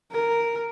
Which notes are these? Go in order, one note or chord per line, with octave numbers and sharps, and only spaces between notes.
A#4